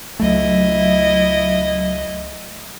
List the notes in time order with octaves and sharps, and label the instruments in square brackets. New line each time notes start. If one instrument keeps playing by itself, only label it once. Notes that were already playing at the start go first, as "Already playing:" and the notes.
[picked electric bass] C#2 A3 [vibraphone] F#3 E5 [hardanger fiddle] E4 D#5